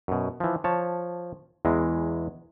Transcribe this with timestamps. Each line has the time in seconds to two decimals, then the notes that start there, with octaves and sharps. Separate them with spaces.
0.08 F#2 B2
0.40 E3 F3
0.64 F3 C#5 A5
1.65 E2 E3 G#3